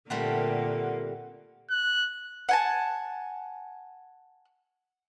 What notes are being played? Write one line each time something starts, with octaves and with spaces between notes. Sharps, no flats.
A#2 D3 G3 A3 A#3 C4 F#5
F#6
F#5 G#5 A5